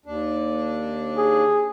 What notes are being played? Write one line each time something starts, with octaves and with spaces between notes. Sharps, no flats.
D#2 D4
G#4